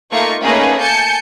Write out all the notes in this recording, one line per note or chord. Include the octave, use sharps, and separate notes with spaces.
A3 A#3 D#4 F4 C#6
A3 A#3 C#4 D#4 G#4 B4
G#5 A5 G6 C#7